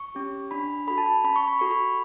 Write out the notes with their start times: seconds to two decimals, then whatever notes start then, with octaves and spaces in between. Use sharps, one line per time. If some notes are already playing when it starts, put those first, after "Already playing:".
Already playing: C#6
0.15 C#4 G4
0.51 D4 B5
0.87 F#4 A4 B5
0.98 A5
1.06 B5
1.24 C#4 B5
1.36 C#6
1.47 B5
1.59 F#4 A4 C#6
1.71 B5